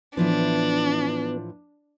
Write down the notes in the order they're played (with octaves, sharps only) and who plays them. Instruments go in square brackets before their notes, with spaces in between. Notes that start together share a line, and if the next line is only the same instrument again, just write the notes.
[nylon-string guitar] A2 E3 F3 [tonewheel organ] B3 [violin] D4